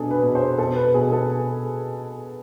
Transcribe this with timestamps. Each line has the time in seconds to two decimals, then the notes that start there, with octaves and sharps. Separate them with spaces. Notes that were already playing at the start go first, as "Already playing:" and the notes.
Already playing: B2 D4 G#4 A4
0.11 B4
0.22 B2
0.35 C5
0.58 B2 A4
0.76 B4
0.94 B2 G#4
1.12 A4